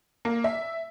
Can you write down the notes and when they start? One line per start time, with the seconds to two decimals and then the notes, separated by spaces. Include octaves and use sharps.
0.25 A#3
0.44 E5